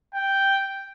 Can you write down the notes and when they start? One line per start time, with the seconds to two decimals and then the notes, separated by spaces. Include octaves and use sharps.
0.14 G5